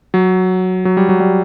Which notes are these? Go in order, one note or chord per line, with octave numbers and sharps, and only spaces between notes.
F#3
F#3
G3
F#3
G3